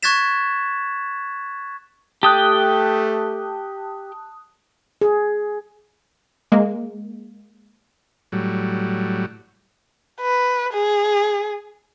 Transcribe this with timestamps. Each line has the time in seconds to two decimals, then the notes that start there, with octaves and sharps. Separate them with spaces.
0.03 C#6 F#6 G#6 A6 B6 E7
2.23 A3 G4 G5 A5 D#6 F#6
5.01 G#4
6.52 G#3 A#3
8.32 A2 F#3 G3
10.21 B4
10.73 G#4